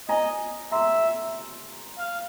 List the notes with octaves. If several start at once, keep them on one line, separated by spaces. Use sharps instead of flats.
D#5 G#5 A#5
E5 A#5 C6
F5